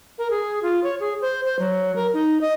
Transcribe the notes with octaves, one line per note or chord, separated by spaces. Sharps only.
A#4
G#4
F4
C#5
G#4
C5
C5
F#3
A#4
D#4
D#5